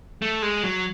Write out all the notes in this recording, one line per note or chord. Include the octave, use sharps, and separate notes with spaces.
A3
G#3
F#3